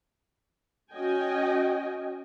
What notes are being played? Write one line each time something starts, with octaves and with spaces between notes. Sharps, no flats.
C#4 F#4 D#5 G5 G#5